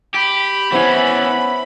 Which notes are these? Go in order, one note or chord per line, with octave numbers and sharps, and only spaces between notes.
G4 B5
E3 B3 C#4 E4 C5